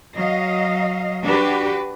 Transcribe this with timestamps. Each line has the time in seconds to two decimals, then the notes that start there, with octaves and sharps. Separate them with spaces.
0.16 F#3 D#5 F5
1.25 D4 F#4 G4 B4